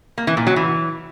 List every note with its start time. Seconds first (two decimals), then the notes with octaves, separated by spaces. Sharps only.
0.18 A#3
0.27 E3
0.37 A#2
0.47 F#3
0.56 E3